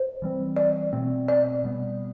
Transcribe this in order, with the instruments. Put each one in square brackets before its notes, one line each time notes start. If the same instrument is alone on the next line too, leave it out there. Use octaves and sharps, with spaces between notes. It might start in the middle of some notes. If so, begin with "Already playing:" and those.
Already playing: [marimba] C5
[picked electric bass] E3 G3 C4
[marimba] D5
[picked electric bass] B2 A3 C4
[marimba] D5
[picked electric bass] B2 G3 B3